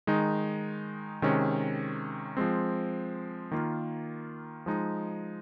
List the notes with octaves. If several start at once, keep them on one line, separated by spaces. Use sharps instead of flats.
D#3 G#3 D#4
C3 D#3 G#3 C#4
F3 G#3 C4
D#3 A#3 F4
F3 G#3 D#4